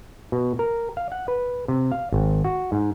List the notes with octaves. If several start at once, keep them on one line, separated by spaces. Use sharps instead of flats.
B2
A#4
F5
F#5
B4
C3
F5
G#1
F#4
G#2